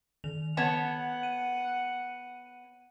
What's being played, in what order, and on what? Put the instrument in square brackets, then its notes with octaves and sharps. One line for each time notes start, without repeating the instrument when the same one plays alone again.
[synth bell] D#3 F7
[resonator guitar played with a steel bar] B3 C#5 A5 [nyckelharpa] F#5
[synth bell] D#7